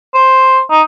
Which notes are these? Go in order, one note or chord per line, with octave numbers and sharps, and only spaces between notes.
C5
D#4